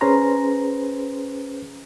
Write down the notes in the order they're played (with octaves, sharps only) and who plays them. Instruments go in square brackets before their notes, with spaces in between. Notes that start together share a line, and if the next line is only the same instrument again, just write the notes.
[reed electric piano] C#4 G#4 B4 C5 A#5 C6